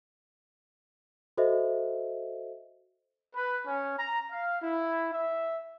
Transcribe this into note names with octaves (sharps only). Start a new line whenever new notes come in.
F#4 A4 C5 D#5 E5
B4
C#4
A#5
F5
E4
E5